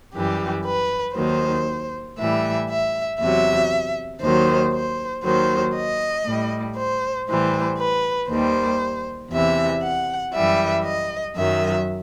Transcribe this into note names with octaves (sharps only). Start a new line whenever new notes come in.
F#2 E3 G3 G4
B4
D#2 D#3 F#3 C5
A2 E3 G3 E5
E5
E2 C3 F#3 E5
D#2 D#3 F#3 C5
C5
D#2 D#3 F#3 C5
D#5
A2 G3
C5
A2 E3 G3 C5
B4
D#2 D#3 G3 C5
E2 C3 E3 E5
F#5
F#2 E3 G3 E5
D#5
F#2 D#3 F#3 E5